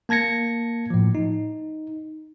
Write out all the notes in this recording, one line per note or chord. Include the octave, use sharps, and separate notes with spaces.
A#3 A5 G#6 A#6 C#7
A2 F3
D#4